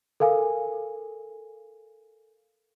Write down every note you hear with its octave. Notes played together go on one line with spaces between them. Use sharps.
A4 A#4 F5 G#5